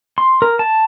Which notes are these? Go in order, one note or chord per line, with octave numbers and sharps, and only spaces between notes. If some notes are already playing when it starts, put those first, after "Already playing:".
C6
A#4
A5